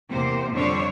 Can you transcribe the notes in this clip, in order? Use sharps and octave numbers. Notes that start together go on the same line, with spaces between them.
E2 C3 A#3 C5
F2 D3 G3 D4 C5 C#5